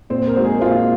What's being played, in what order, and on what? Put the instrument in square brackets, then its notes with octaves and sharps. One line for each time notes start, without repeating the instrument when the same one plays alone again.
[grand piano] A#2 [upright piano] C4
[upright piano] A#4
[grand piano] G#3 D#4 F#4 C5
[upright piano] G#4
[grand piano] A#2 [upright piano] F4